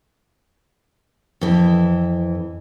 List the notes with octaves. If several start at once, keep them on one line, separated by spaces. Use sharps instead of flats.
F2 E3